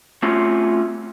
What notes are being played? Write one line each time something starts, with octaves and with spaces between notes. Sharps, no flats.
A3 C4 C#4 F4 F#4